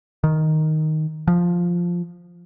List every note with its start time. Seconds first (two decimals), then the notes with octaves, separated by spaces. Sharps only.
0.24 D#3
1.28 F3